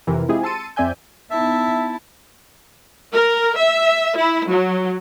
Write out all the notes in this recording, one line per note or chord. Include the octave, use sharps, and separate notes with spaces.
F2 C3 E3 A#4
G#3 C4 E4 F4 G4 G#4
A5 C6 E6 A6 C#7 D#7
F2 C4 D5 E5 G#5 G6
B3 D#4 E4 E5 A5
A#4
E5
E4
F#3